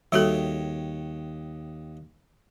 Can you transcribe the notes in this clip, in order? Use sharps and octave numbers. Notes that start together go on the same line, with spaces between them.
D#2 G3 F#4 A4 C#5 G5